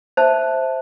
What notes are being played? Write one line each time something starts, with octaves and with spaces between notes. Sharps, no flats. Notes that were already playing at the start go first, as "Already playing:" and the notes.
C5 E5 A5